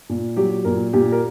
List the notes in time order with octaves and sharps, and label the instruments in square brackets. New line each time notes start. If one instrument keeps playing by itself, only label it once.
[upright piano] A#2
F#3 G4
A#2 A#4
A#2 G4
A#4